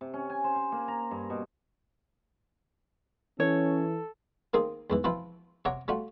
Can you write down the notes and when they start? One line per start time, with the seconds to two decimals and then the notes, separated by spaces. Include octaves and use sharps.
0.01 C3
0.14 C#4
0.30 G#5
0.44 C5
0.56 G#5
0.72 A#3
0.88 A#5
1.11 G2
1.30 B2
3.40 E3 C#4 A4 C#5
4.54 D#3 A#3 C4 G#4
4.90 E2 G#2 E3
5.04 E3 F3 C4 E4 F4
5.65 C3 C#5 F#5 A#5 D6
5.88 G3 A3 F4 F#4